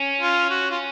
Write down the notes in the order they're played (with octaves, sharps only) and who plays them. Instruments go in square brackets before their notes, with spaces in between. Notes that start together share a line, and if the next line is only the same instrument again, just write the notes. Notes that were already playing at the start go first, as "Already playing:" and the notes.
Already playing: [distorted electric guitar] C#4
[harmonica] F4
F#4
F4